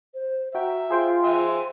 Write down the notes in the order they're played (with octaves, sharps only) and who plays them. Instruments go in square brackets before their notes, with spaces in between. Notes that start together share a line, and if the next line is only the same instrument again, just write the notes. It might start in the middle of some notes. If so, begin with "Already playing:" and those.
[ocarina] C5
[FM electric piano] F#4 G5 [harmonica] E5 [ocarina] A#5
[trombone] F4 [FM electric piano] G#4 C5 G5 [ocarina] C6
[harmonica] E5 G#5